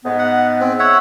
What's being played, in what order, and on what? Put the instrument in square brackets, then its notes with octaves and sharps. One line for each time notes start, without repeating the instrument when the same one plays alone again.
[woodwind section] G#2 B3
[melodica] F#5
C4
C#5 E5 F#5